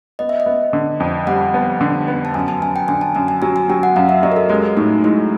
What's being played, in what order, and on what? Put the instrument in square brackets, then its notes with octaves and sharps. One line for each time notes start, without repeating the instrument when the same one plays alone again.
[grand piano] B3 [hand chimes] D#5
[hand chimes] E5
D#5
[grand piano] B3
D3
F2
[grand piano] G3 [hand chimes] F#5
[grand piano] B3
D3
B3
[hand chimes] A5
[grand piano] F#2 [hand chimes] G#5
[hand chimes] A5
[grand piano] F#2 [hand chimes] G#5
[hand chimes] G5
[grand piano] D3 [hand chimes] G#5
[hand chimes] A5
[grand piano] F#2 [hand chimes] G#5
[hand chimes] G#5
[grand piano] F#3 [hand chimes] G#5
[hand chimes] G#5
[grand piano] F#3 [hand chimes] G5
[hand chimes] F#5
[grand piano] F#2 [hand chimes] F5
[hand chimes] E5
[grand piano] F#3 [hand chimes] D#5
[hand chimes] A#4
A4
[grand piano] G#3 [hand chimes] G4
[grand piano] A2 [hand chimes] D#4
[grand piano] G#3 [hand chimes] E4